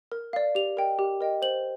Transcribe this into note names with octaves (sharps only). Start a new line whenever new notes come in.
A#4
D5 F5
G4 F7
A#4 D#5 G5
G4
A#4 D#5 G5
C5 F#7